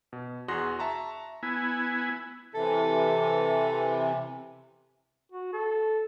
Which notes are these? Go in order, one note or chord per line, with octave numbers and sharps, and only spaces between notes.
B2
E2 F#4 G#4 C6 F#6 A#6
E5 A5 A#5 C#6
B3 E4 G#5
C3 E3 A4
F#4
A4